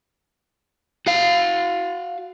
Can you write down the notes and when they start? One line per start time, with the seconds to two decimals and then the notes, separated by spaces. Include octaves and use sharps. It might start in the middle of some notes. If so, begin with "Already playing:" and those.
1.07 F#4 F5